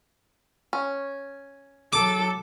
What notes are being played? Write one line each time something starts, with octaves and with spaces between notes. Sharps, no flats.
C#4
F#3 A4 D6